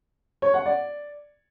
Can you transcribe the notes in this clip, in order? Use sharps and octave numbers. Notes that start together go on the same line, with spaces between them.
C#5
F#5
D5